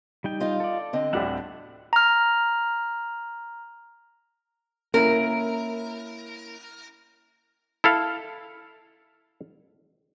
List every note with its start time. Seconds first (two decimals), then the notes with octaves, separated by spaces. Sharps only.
0.24 G3 D#4 G5
0.40 F4 D#5 F5
0.60 A4 D5
0.93 D3 C4 D#5
1.13 D2 A2 G3 E5 F#5
1.93 A#5 F6
4.94 A#3 C#4 E4 A#4
7.84 E4 A4 F5